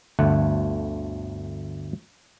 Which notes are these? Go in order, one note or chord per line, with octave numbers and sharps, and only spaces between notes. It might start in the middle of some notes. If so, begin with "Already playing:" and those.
G1 D2 A3 F#5